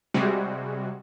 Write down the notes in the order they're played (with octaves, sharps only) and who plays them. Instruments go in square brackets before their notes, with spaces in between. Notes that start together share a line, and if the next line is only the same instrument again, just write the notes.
[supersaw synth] C3 G3 G#3 F#4